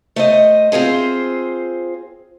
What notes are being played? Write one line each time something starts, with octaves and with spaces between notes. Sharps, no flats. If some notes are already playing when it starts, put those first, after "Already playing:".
A3 C5 D#5
C4 F4 G#4 C5